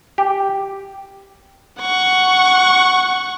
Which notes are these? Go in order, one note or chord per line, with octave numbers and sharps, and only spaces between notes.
G4
F#5 C#6